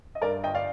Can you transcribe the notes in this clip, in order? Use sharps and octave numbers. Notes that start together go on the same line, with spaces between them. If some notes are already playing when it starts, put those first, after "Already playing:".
D#5
G2 A#4 D5
G1 D#5 G5
D5 F5